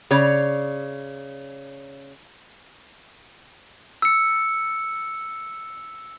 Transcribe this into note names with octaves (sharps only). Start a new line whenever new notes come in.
C#3 C#5 D5
E6 C#7